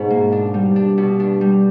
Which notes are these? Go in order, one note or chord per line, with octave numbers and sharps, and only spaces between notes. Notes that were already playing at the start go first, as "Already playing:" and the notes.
Already playing: G#2 B2
A#3
D4
G2 G3
D4
B2
D4
G3